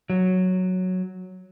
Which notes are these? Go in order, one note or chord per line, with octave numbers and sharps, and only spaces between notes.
F#3